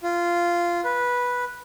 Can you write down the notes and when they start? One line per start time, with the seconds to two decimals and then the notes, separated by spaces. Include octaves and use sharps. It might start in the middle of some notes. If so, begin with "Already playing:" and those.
0.03 F4
0.84 B4